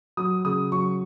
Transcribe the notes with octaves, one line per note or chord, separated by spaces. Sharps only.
F#3 D#6
C#3 D#6
F#3 C#6